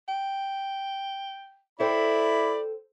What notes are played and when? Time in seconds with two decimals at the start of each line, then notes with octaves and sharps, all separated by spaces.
0.08 G5
1.80 E4 A4 C5 D5 G5 B5